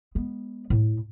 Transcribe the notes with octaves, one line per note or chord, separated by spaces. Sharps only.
G#3 B3
A2